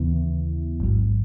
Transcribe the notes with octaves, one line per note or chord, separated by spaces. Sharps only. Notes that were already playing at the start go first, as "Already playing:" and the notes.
Already playing: D#2 C#3 E3 B3 E4
A1 G#2 F#3